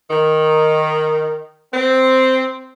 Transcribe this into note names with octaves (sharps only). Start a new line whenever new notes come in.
D#3
C4